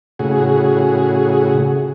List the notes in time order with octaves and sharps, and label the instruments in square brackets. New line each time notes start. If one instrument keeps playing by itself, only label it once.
[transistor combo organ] A2 C#3 F#4 G#4